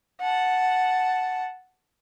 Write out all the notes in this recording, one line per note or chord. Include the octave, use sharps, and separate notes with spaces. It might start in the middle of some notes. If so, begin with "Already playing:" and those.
F#5 A5